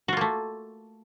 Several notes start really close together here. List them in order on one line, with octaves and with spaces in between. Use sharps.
F#4 F4 A#3 A3